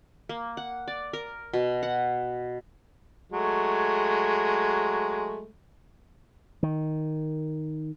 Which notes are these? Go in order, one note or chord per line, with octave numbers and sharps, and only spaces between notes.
A#3
F#5
D5
A#4
B2
F#5
F#3 G#3 A3
D#3